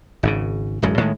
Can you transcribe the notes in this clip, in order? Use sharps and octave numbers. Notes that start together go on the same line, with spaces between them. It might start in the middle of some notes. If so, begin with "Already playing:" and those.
G#1 G#2 C#3
D1 F#2 G#3
A2 D#3 G3 G#3